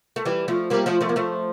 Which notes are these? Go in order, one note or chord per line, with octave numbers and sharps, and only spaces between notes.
A3
E3 G3
F3 A3
G3 A#3
F3 A3
F3 A3
A#3
F3 A3